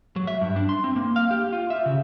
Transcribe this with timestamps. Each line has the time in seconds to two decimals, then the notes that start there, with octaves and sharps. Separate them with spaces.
0.16 F#3
0.27 E5
0.41 G2
0.56 D4
0.69 C6
0.84 C4
0.96 A#3
1.16 F5
1.31 G4
1.52 F4
1.70 E5
1.86 C#3